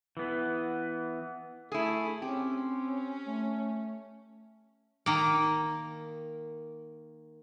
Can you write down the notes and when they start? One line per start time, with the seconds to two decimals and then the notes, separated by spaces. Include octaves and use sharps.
0.17 E3 B3
1.72 A3 E4 G#4 A4
2.22 C4 C#4 G4
3.27 A3
5.06 D#3 A#3